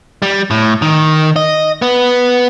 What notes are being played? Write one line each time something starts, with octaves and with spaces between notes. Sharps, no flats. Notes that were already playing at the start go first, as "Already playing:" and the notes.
G3
A2
D#3
D#5
B3